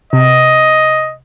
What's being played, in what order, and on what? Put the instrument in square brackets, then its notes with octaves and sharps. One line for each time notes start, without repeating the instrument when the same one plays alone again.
[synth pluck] C3 [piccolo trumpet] D#5